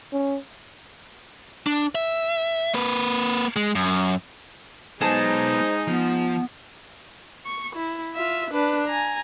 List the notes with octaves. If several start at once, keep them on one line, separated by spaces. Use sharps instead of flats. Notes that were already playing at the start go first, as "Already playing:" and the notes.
C#4
D4
E5
A#3 B4
G#3
F#2
F#3 G#3 B3 D#4 G#4 C5 A5 A#5
F3 B3
C#6
E4
F4 E5
D4 B4
G#5 A#5